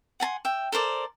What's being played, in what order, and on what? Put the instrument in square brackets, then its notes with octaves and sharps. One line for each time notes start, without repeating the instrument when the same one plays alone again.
[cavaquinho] F#5 G#5 A5 C6
E5 G5
A4 A#4 C5 D5